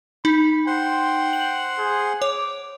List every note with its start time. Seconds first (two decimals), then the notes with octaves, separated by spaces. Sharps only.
0.25 D#4 B5
0.67 C5 F#5 G5 C6
1.33 F#7
1.79 G#4
2.22 C#5 D6